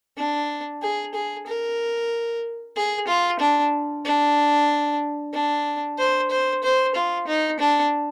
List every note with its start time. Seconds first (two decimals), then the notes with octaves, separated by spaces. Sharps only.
0.17 D4
0.82 G#4
1.14 G#4
1.47 A#4
2.76 G#4
3.07 F4
3.39 D4
4.05 D4
5.33 D4
5.98 C5
6.30 C5
6.63 C5
6.95 F4
7.27 D#4
7.59 D4